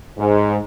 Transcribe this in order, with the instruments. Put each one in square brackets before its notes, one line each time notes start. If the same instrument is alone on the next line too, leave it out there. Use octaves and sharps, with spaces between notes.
[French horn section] G#2